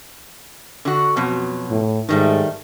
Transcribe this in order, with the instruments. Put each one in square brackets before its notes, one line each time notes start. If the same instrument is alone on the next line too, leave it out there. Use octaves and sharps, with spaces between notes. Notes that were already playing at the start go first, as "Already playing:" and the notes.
[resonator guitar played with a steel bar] D3 F#4
F2 B2 F#3
[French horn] A2
[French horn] G#2 [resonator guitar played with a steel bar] D#3 G3 A3